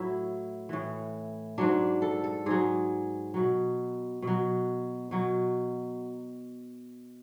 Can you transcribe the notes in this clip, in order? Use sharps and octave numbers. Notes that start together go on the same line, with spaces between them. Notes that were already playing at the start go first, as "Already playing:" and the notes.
Already playing: A2 F#3 E4
A2 E3
G#2 F#3 D4
A4
A4
G#2 F#3 G#4
B2 F#3
B2 F#3
B2 F#3